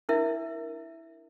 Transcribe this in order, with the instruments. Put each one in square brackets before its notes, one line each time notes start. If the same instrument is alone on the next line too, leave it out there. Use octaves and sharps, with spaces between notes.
[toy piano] D4 E4 A#4 E5